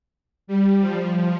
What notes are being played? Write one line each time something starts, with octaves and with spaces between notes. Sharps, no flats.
G3
F3